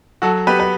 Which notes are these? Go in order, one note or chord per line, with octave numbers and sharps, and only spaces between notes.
F#3 F#4 A4
B3 G4 B4
B4